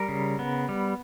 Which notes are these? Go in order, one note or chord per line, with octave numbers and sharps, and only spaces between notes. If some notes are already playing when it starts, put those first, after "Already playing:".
Already playing: G3 A#4
C#3
B3
G3